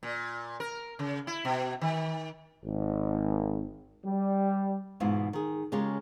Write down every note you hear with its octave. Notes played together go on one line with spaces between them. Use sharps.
A#2
A#4
C#3
E4
B2
D#3
G#1
G3
E2 G#2 B2 E4 F4
D#3 G#4
C#3 G#3 C#4 F4 G4 A#4